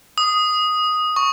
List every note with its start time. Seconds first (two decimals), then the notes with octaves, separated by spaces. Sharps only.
0.18 D#6
1.16 C#6